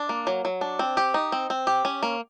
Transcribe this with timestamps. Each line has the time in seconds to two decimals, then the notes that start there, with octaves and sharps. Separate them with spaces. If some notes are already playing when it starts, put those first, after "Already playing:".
Already playing: D4
0.09 A#3
0.27 F#3
0.45 F#3
0.61 D4
0.79 C4
0.97 G4
1.14 D#4
1.32 C4
1.50 C4
1.67 G4
1.85 C#4
2.03 A#3